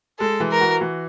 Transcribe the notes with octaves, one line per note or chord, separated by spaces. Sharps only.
G#3 A4
E3
A#4
F#4
E3